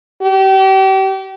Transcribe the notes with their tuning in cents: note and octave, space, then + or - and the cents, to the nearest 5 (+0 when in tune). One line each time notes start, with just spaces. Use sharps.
G4 -35